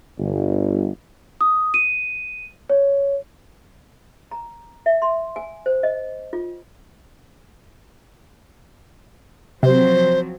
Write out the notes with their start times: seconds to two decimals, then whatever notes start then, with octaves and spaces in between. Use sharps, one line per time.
0.18 G1
1.41 D#6
1.74 D#7
2.70 C#5
4.31 A#5
4.86 E5
5.02 C6
5.36 G#5
5.66 C5
5.83 D#5
6.33 F4
9.63 C3 F3 F#3 C4 C5